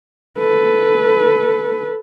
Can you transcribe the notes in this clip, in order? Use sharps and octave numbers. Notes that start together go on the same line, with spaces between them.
A4 B4